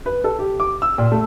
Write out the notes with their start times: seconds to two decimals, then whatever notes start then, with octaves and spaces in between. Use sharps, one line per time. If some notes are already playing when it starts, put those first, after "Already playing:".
0.06 B4
0.24 A4
0.39 G4
0.60 D6
0.82 E6
0.98 A#2
1.12 A3